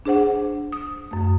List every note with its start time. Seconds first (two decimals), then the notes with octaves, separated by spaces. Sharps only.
0.05 D4 G#4 C5 F#5
0.72 D#6
1.11 F#2 A3